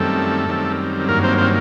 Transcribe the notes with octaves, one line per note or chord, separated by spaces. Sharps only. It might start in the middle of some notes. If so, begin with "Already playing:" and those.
Already playing: F#2 D#3 G3 A3 C4 A4
F#2 D#3 G3 C4
G2 D#3 F#3 A#3 A#4
C4 C5
C4 C5